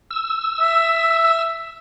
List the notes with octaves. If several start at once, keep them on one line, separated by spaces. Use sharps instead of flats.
E6
E5